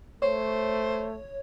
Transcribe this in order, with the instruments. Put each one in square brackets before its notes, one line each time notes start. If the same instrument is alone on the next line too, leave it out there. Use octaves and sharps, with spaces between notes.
[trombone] A3 [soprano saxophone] C5 [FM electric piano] C#5